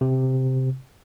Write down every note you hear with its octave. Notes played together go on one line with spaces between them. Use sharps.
C3